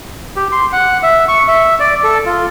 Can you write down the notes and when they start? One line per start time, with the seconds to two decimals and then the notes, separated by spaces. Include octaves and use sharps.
0.36 G4
0.52 C6
0.73 F#5
1.03 E5
1.28 C#6
1.48 E5
1.80 D5
2.04 A4
2.25 F4